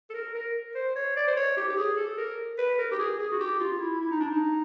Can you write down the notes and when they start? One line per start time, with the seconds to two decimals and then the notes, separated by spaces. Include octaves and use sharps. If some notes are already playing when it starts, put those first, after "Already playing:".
0.10 A4
0.14 A#4
0.35 A#4
0.75 C5
0.96 C#5
1.16 D5
1.27 C5
1.37 C#5
1.57 G4
1.68 G4
1.77 G#4
1.97 A4
2.17 A#4
2.58 B4
2.78 A#4
2.91 G4
2.99 G#4
3.19 G#4
3.32 F#4
3.40 G4
3.60 F4
3.80 E4
4.01 E4
4.11 D#4
4.20 D4
4.30 D#4